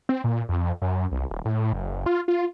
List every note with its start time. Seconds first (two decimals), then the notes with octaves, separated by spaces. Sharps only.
0.09 C4
0.24 A#2
0.49 F2
0.82 F#2
1.12 C2
1.31 D#1
1.45 A2
1.73 F#1
2.06 F4
2.28 F4